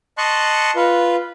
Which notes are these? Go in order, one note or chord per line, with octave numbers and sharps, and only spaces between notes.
D#5 A5 C6 C#6 F#6
F4 B4